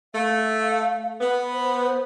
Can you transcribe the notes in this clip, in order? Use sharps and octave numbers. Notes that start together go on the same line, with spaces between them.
A3 F5
B3
C5